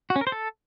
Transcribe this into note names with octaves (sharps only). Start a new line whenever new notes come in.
F#4
C#4
A#4
C5
A4